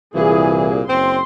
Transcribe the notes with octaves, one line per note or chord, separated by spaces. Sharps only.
C2 A#2 E3 G#4
F#1 C4 C6